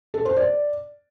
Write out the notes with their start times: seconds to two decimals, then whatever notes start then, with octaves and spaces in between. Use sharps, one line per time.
0.14 A4
0.25 C5
0.37 D5